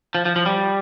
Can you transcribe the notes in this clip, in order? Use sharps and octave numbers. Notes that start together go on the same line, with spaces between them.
F3
F3
F3
G3